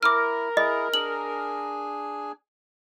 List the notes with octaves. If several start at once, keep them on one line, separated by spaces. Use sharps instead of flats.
E4 A#4 D6 F6
E4 G#4 D#5
D4 G#4 G#5 F#7